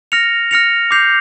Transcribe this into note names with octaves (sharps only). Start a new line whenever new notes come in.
F6 A#6 C#7 F7
F6 A#6 C#7 F7
D6 G6 C7 F7